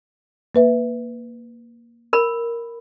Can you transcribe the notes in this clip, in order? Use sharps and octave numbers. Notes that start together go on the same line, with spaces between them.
A#3 B4 E5
A#4 B5